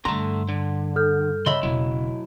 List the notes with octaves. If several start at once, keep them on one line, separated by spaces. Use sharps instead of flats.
G2 D3 A3 A#5 C6
D3
A4 F6 G6
C#3 D#5 E5 B5 C6
E1 F#3 E4